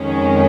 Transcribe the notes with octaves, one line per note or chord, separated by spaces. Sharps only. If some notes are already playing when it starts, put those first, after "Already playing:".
Already playing: F2 D#3 G#3 C#4